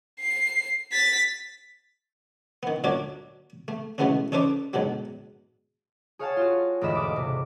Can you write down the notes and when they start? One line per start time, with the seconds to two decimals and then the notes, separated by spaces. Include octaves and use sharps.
0.20 C7
0.92 A6 B6
2.63 D#3 B3
2.84 D2 A#2 F#3 D4 C#5 D5
3.68 A3
3.98 B2 E3 G#3 A3 B3 C#4
4.32 C#4 D#4 A4 B4 C5 D5
4.73 G#2 B2 D3 F#3
6.19 G#4 C#5 F5 F#5 G#5 A5
6.37 F4 F#4
6.81 E1 D2 G#2 D#5 B5 E7
6.95 D6
7.16 C3